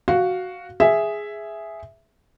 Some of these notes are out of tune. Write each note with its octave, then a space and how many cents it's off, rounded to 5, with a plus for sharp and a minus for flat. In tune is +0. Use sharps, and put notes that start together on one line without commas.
F#4 +0 F5 +5
G#4 +0 E5 +0